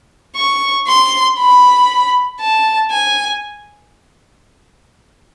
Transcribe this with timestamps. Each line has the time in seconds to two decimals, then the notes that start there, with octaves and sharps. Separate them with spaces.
0.36 C#6
0.87 C6
1.38 B5
2.40 A5
2.91 G#5